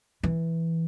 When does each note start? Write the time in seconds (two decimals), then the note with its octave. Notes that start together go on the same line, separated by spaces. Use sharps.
0.23 E3